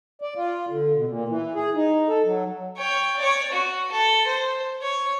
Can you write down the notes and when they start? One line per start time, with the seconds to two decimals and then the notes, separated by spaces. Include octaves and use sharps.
0.22 D5
0.36 F4
0.69 D3
0.95 B2
1.07 A#2
1.28 E3
1.54 G#4
1.75 D#4
2.09 A4
2.25 F#3
2.77 C#5 G5
3.18 C#5 D5
3.52 F#4
3.91 A4
4.27 C5
4.82 C#5